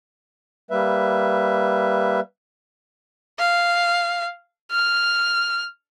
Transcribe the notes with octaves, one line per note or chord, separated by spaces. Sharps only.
G3 A#3 B4 E5
F5
F6